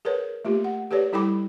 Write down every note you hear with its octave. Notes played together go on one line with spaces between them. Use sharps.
G#4 A#4 B4 C#5
A3 A#3 F4 G4
F#5
G4 A4 B4 C#5 D5
G3 E4 A4 G5 B5 D6